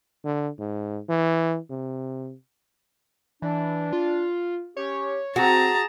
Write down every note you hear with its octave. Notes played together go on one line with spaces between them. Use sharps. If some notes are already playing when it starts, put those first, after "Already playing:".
D3
G#2
E3
C3
E3 D4
F4
C#4 G4 C#5
C4 F#4 G#4 A5 A#5